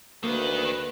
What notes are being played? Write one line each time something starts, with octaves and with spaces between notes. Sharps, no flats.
D2 D#3 A#3 B4